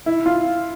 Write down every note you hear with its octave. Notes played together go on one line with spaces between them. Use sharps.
E4
F4